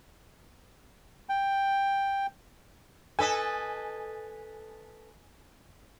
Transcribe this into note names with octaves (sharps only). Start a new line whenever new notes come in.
G5
A4 B4 D#5 G#5